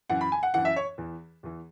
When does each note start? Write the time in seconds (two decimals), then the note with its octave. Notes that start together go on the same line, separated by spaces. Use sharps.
0.10 F#2 E3 F#5
0.21 B5
0.32 G#5
0.43 F#5
0.54 F#2 E3 F#5
0.65 E5
0.76 C#5
0.98 E2 E3
1.43 E2 E3